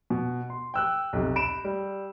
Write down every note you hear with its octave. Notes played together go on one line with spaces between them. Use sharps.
B2
C6
G5 E6 F#6
B1 C3
B5 D7 E7
G3